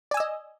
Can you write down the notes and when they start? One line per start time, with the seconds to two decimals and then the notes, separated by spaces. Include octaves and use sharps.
0.11 D5
0.14 G#5
0.17 E6
0.20 D#5